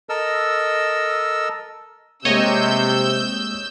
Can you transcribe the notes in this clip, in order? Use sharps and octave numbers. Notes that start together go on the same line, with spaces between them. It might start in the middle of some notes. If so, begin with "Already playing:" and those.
A4 A#4 D#5 E6
C3 G#3 A#3 C#5 D#5 E6 G6